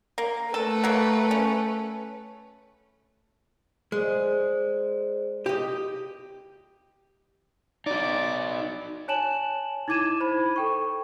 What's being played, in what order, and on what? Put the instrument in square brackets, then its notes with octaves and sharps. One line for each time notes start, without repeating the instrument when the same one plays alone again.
[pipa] A#3
[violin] A3 B4 [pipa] A4
[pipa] F#3 A#3
C#4
[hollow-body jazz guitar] G#3 [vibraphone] G#4 C5 D5
[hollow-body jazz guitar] G4 D#5
[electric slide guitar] D#4 F#4 [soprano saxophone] D5
[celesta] C#5 G#5 A5 E7 F#7
D#4 E4 D6 G#6 D#7 E7
C5 B5
A4 G5 C#6